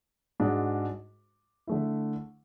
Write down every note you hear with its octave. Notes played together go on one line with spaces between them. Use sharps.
G#2 G#3 D4 F#4
D3 A3 E4